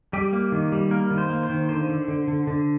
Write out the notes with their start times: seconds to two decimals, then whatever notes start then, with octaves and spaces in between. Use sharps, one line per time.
0.13 G3 G4
0.33 A#3
0.52 D#3
0.72 G3
0.91 A#3 A#4
1.11 D#3
1.18 C5
1.30 A#3
1.43 C5
1.50 D#3
1.69 D3 C5
1.89 D3
2.08 D3
2.28 D3
2.47 D3